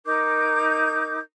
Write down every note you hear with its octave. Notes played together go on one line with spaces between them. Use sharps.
D#4 A#4 D6 G6